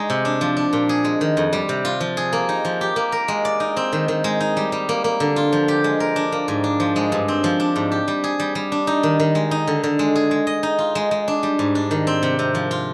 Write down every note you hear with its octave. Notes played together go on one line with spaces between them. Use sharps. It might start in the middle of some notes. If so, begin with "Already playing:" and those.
Already playing: G#3 D#4 D5
C3
D4
F3
D4
A#2
G#4
G#3
D#3
F2
G3
C3
F4
F3
G#4
A#3
D#4
F3
G4
A#3
A#4
G#3
D5
D#4
C4
D#3
D#3
G#3
D#4
G3
G3
A#3
A#3
D3
F4
F3
G4
G#3
A#4
D4
A#3
G#2
D4
F3
G#3
G2
C4
F3
D4
G#2
G4
G3
G#4
G3
G3
D4
D#4
D#3
D#3
G#3
D#4
D3
D3
G#3
G#4
G#3
D#5
D#4
F4
G#3
G#3
D4
G3
G#2
D4
D#3
C4
C3
C3
F3
F4